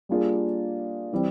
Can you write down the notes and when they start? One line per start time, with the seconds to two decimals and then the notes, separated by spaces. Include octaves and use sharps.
0.09 G3 A#3 D4 F4 G#4
1.13 E3 G3 C4